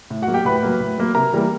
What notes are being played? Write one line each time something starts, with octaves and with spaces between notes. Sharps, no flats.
A2
F#4 F#5
F#3 A#3
G4 G5
A2 B4 B5
F#3 A#3
A2
F#3 A#3
C3 A#4 A#5
E3 G3 A#3